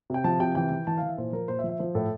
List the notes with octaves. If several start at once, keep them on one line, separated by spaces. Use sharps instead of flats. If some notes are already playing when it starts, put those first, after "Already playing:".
C3 G5
F3 A5
C3 G5
E3 G5
E3
E3 A5
F5
E3 E5
A#2 C5
F3 A#4
A#2 C5
E5
F3
E5
F3 C5
A2 A4